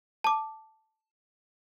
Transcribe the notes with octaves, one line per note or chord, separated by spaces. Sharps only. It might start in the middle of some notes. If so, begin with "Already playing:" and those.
A5 D6